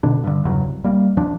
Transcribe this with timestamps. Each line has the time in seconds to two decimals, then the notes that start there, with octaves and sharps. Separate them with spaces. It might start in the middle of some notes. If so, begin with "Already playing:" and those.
0.03 B2 D3 D4
0.24 G2 D3
0.45 E2 G2 C#3 F#3
0.64 C2
0.84 G3 A#3
1.17 D#2 F3 D4